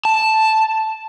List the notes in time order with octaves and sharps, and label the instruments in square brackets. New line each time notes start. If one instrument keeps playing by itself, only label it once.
[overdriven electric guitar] A5